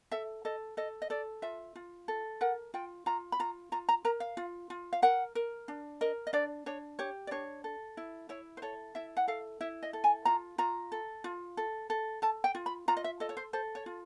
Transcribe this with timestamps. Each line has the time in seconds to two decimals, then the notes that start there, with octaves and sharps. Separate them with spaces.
0.12 A4 E5
0.45 A4 D#5
0.77 A4 D#5
1.02 D#5
1.10 A4 D5
1.42 F4 E5
1.75 F4
2.08 A4
2.41 A#4 F#5
2.74 F4 G5
3.06 F4 A#5
3.32 B5
3.40 F4 A#5
3.72 F4 A#5
3.89 A#5
4.05 A#4 A#5
4.20 F5
4.37 F4
4.70 F4
4.93 F5
5.02 A#4 F#5
5.35 A#4
5.68 D4
6.01 A#4 D#5
6.27 D#5
6.33 D4 D5
6.66 D4 C#5
6.99 G4 C#5
7.27 D5
7.31 D4 C#5
7.64 A4
7.97 E4
8.29 E4 C#5
8.57 C5
8.62 A4 C#5
8.95 E4 E5
9.17 F#5
9.28 A4 F5
9.61 E4 E5
9.83 D#5
9.93 A4
10.04 G#5
10.25 F4 A#5
10.58 F4 A#5
10.92 A4
11.24 F4
11.57 A4
11.90 A4
12.22 A4 A5
12.44 G5
12.55 F4
12.66 B5
12.88 F4 A#5
12.97 D#5
13.04 E5
13.20 A4 D#5
13.29 C#5
13.37 C5
13.53 A4 C5
13.75 C#5
13.86 F4